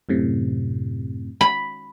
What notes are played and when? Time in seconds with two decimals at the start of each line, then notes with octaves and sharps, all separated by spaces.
0.09 F#2 A2 C3
1.41 B5